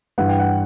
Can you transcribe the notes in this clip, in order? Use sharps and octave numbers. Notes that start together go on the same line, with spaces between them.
G2 E3 F#5
G5
F#5